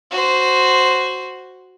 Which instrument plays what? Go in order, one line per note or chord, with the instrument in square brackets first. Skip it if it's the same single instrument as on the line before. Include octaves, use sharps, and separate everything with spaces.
[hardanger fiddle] F#4 C5